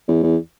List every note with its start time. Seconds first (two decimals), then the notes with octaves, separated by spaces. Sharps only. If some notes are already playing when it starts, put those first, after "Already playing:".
0.08 E2
0.23 E2